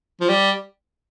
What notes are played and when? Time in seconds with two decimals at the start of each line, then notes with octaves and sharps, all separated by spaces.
0.21 F3
0.29 G3